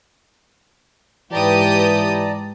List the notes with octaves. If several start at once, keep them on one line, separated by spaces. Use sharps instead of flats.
G#2 E3 G4 B4 D5 A5 A#5 D#6